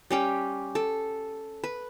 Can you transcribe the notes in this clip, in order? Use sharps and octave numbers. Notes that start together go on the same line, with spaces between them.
G3 C#4 G4
A4
B4